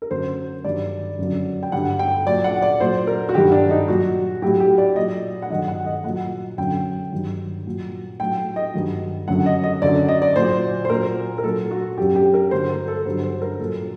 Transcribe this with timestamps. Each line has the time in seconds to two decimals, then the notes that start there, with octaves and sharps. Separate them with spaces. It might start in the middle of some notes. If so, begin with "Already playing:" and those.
0.02 A#4
0.11 F#2 D3 F#3 C5
0.65 G2 D#3 F#3 D5
1.19 F#2 D3 F#3
1.63 G5
1.72 G2 D3 F#3 F#5
1.99 G5
2.26 A#2 F#3 D5
2.44 F#5
2.62 D5
2.80 A#2 F#3 C5
3.07 A#4
3.29 F#4
3.34 G2 D#3 F#3 G4
3.52 D4
3.70 D#4
3.88 A#2 F#3 F#4
4.42 A2 F#3 G4
4.60 G4
4.78 D5
4.96 A#2 F#3 D#5
5.42 F#5
5.50 G2 D#3 F#3 D#5
5.68 F#5
5.86 D#5
6.04 A#2 F#3 F#5
6.58 F#2 D3 F#3 G5
7.12 G2 D#3 F#3
7.66 A#2 F#3
8.20 A2 F#3 G5
8.56 D#5
8.74 G2 D#3 F#3
9.28 F#2 D3 F#3 F#5
9.46 D#5
9.64 D#5
9.82 F#2 D3 F#3 D5
10.08 D#5
10.22 D5
10.36 A#2 F#3 C5
10.85 C5
10.89 A#2 F#3 A#4
11.38 A#4
11.44 A#2 F#3 A4
11.71 F#4
11.98 F#2 F#3 G4
12.16 G4
12.34 A#4
12.51 G2 D3 F#3 C5
12.70 A#4
12.88 A4
13.06 G2 D3 F#3 C5
13.24 C5
13.42 A#4
13.60 A#2 F#3 A4